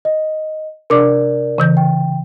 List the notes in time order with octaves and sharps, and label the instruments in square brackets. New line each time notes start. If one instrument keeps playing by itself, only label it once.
[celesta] D#5
[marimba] C3 D4 D6 [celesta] A#4 D5
[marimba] C#3 E3 G6
[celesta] G5